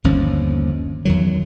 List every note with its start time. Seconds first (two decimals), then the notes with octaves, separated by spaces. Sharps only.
0.04 G1 D#2 F3 C#4
1.05 E2 D#3 F#3